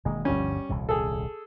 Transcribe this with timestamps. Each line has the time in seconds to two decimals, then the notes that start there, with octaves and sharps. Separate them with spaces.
0.05 E1 D#3 G#3 A#3
0.25 G1 D2 F3 G3 C#4
0.69 D#1 C2 C3
0.89 G#4 A4